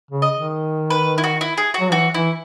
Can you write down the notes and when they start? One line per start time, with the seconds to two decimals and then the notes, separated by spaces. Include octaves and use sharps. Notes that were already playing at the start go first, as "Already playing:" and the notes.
0.11 C#3
0.22 D#5
0.34 D#3
0.90 B4
1.18 E4
1.24 F#4
1.41 E4
1.58 G#4
1.74 F#4
1.80 F#3
1.92 E3 F#4
2.14 E3 E4